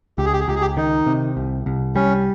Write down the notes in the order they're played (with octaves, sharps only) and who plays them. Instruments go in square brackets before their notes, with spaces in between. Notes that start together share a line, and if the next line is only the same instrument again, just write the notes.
[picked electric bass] C#2 [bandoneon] G4
[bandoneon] G#4
G4
G#4
[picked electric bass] C#2 [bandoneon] G4
[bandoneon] G#4
G4
[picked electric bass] D#3 [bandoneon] D#4
[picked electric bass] C3
C2
C2
[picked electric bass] G3 [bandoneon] C#4